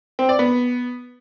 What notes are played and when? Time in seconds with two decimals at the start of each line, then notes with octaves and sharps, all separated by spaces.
0.19 C4
0.29 D5
0.39 B3